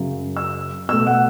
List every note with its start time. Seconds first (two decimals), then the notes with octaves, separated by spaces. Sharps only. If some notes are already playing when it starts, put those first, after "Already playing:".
Already playing: F#2 C#3 F#3
0.37 E6
0.89 B2 A3 E6
1.07 F#5